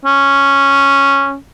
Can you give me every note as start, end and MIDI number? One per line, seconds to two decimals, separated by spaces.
0.05 1.36 61